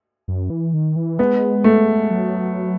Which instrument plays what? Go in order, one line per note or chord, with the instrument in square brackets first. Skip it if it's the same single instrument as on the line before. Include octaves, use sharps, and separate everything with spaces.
[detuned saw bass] F#2
E3
D#3
E3
[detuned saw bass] G#3 [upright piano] B3
[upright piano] A3
[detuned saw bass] F#3